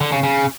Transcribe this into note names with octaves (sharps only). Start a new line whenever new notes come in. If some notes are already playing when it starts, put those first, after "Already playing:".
D3
C#3
C#3